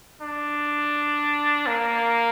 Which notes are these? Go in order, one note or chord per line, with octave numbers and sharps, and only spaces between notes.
D4
A#3